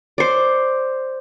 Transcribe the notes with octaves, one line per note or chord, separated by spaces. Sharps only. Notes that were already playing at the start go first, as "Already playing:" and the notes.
C5 D5